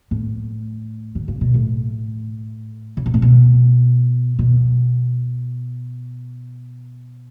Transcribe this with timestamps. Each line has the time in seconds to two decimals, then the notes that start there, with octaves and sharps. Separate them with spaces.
0.11 A2
1.15 D3
1.28 C#3
1.41 B2
1.54 A2
2.97 C#3
3.06 B2
3.14 A2
3.22 B2
4.39 B2